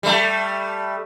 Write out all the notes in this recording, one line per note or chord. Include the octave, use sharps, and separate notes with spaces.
G3 A3